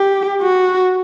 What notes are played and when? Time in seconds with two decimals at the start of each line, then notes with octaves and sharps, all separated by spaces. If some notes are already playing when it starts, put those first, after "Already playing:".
Already playing: G4
0.42 F#4